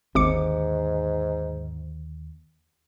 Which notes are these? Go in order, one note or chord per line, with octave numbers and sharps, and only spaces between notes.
G#1 D#2 G#2 D3 D6 C#7